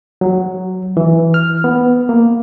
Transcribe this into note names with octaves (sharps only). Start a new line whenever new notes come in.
F#3
E3
F6
B3
A#3